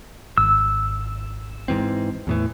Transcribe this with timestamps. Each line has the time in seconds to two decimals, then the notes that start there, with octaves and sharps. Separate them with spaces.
0.38 G#1 E6
1.68 G#2 E3 C4
2.27 E2 A2 E3